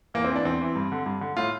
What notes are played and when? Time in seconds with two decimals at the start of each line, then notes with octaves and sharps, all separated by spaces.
0.14 E2 A#3
0.24 C4
0.30 E3
0.36 D4
0.45 E2 C4
0.61 E3
0.75 G2
0.92 D3
1.06 G2
1.21 D3
1.37 A2 F4